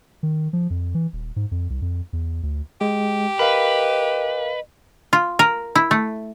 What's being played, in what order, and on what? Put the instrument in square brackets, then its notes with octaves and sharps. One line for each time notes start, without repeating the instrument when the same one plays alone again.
[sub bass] D#3
F3
F2
E3
D#1
G#2
F2
C2
F2
E2
D2
[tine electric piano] G#3 [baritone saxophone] G4
[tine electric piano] A#4 F5 [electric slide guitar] B4 [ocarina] D#5
[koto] F4
A#4
E4
A3